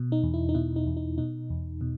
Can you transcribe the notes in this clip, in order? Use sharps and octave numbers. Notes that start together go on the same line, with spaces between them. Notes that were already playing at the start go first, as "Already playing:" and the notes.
Already playing: B2
D#4
E2
E4
D#4
B2 E4
D#4
E2
D#4
B2 D#4
E2
B2